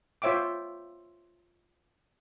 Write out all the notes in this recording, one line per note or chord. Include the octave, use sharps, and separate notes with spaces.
F4 C5 C#5 E5 G5 D6